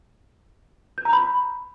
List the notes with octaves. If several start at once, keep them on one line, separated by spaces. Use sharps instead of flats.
G6
A#5
B5